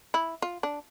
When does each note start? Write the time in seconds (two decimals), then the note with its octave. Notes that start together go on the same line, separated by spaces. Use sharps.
0.14 E4
0.42 F4
0.63 D4